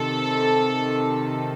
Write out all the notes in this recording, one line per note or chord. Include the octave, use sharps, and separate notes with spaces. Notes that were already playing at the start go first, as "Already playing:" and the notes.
Already playing: C3 D#3 A4